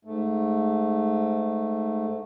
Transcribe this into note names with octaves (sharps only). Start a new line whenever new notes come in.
G#2 A3